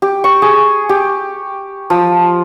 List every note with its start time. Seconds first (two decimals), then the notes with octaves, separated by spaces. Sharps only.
0.02 G4
0.24 C#6
0.42 G#4
0.89 G4
1.90 F3